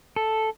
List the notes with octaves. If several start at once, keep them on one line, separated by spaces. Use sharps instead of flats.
A4